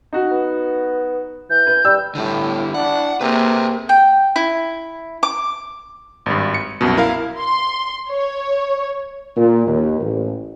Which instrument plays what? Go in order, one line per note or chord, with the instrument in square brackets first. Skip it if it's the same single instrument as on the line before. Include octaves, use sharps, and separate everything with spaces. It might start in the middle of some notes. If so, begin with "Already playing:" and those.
[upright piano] D#4 F#4
[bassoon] B3
[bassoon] E3 [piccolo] G6
[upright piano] B4
[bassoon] G3 [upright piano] E6
[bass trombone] A2 [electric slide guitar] D3 G3 [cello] E4 G4
[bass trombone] D4 [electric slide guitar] F#5
[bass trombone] C3 [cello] A#3 G#4 [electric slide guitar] A#4 B4
[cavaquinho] G5
E4
D6
[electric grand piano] G#1 G2
C#7
C2 F#2 B2
E4 A#4 F5
[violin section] C6
C#5
[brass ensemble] A#2
D#2
A1